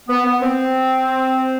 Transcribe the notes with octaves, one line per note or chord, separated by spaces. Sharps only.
B3
B3
C4